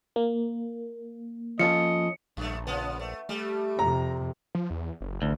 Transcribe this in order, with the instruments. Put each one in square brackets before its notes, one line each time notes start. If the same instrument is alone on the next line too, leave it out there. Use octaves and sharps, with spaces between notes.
[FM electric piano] A#3
[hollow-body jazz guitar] F3 C#4 A4 [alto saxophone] D#5 [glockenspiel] C#7
[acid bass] A#1 [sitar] F#2 A3
[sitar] C#3 F3 B3
A3
[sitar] G3 [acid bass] A3
[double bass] F2 C3 [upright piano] A#5
[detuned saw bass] F3
E2
F#1
[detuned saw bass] A1 [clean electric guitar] D2